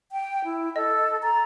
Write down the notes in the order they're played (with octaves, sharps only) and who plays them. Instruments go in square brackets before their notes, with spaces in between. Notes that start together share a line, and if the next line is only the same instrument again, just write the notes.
[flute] G5
E4
[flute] A4 [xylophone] D#5
[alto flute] A#5 [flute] A6